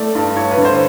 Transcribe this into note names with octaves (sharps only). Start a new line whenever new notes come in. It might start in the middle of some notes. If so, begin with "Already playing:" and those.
Already playing: A3 D5
G2
G2 C#5
B4
D3
C5